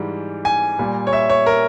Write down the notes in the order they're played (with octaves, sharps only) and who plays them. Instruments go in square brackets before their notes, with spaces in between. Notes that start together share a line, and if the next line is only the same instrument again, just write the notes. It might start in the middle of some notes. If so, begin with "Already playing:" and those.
Already playing: [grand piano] G#2 E3 G3
G#5
A#2 G3
C#5
E5
C#5
A#4